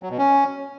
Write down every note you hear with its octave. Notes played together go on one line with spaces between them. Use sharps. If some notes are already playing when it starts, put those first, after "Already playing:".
F#3
B2
C#4